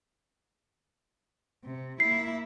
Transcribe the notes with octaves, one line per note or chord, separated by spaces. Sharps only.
C3
A#3 E4 C7